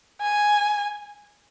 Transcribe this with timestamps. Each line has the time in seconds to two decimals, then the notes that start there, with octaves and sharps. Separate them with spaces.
0.21 G#5